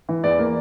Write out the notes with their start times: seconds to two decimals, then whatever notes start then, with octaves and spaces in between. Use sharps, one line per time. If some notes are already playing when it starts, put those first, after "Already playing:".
0.09 E3
0.24 E2 D5
0.39 A#3